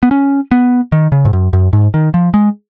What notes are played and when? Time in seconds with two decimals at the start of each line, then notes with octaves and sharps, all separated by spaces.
0.03 B3
0.11 C#4
0.51 B3
0.92 D#3
1.12 C#3
1.25 G#2
1.33 F#2
1.53 F#2
1.73 G#2
1.94 D#3
2.14 F3
2.34 G#3